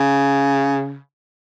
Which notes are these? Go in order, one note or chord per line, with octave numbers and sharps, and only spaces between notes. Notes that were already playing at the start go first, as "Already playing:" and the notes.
Already playing: C#3